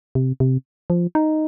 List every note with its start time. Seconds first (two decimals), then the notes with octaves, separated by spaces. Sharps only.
0.15 C3
0.40 C3
0.90 F3
1.15 D#4